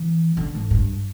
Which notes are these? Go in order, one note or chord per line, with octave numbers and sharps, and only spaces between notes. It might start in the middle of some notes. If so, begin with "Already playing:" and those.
Already playing: E3
D3
G#2
G2